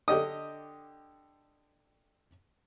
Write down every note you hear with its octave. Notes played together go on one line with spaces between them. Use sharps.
D3 G4 D#5 D#6